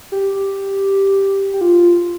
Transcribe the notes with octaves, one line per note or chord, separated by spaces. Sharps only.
G4
G4
F4